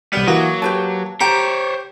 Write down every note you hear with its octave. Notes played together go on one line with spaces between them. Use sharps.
C2 G3 B3 F6
E3 F#3 A#3 F#4 D#6
G4 B4 C#5 A5
G4 C5 C#5 A#5